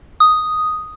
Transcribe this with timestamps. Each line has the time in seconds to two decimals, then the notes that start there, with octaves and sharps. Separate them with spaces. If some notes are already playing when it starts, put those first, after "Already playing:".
0.20 D#6